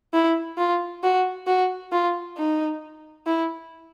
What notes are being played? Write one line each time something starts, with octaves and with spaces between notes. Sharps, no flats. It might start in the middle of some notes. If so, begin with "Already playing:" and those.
E4
F4
F#4
F#4
F4
D#4
E4